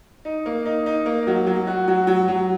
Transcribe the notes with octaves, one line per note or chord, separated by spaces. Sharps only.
D#4
A#3
D#4
D#4
A#3
F#3
F#3
F#4
F#3
F#3
F#3